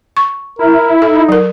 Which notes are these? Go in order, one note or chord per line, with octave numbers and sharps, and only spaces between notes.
C#6
E4 A#4
D#4 A4
F#3 A#4